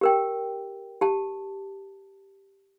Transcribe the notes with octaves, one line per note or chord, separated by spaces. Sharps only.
G4 A#4 G5
G4 A5